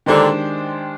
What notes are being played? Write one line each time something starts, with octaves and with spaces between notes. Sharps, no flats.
A#2 D3 D#3 G#3 D4 G4 C5